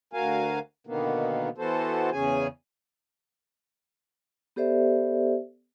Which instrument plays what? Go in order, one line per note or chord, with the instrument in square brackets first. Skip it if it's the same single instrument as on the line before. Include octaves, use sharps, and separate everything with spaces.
[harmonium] D2 F#4 A#4 F5 G#5
B2 D3 D#3 A#3 B3
E3 B3 F#4 A4 C5
E2 C#3 C#4 G#4 G#5
[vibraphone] B3 G4 A4 C5 D5 E5